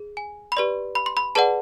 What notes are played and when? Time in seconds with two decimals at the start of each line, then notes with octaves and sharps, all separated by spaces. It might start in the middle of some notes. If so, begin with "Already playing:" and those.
Already playing: G#4
0.17 G#5
0.52 B5
0.57 G4 B4 D5 C6
0.95 B5
1.06 C6
1.17 B5
1.35 G#4 B4 D5 F#5 A5